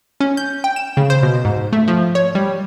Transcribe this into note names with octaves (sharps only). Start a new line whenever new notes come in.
C#4
G6
G5
E7
C#3
C5
B2
G#2
A3
F3
C#5
G3